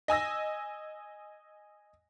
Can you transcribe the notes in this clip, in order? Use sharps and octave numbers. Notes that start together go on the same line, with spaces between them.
D#5 G#5 E6 A#6